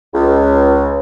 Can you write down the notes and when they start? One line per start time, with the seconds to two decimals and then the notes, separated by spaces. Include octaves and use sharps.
0.14 C#2